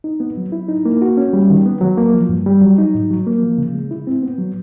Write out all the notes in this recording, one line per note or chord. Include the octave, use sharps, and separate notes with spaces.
D#4
B3
F#3
E4
D#4
A#3
F#4
C#4
G3
D#3
B3
F#3
A#3
F3
G2
G3
F#3
D#4
G#2
F#3
A#3
F3
C#3
G#3
E4
C4
B3
F#3